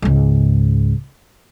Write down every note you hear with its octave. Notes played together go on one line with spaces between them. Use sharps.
C#2 G#2